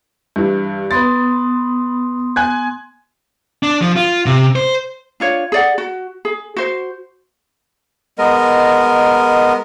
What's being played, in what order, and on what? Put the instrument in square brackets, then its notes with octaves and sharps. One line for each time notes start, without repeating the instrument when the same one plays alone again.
[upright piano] G2 E3
[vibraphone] B3 C6 D#6 [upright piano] B4 A6
[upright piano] G#5 F#6 G#6
[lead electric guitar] D4
F3
F4
C3
C5
[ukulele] D4 F4 C#5
G#4 D5 F#5
F#4
G#4
F#4 C5
[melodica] G#3 B3 A#4 D#5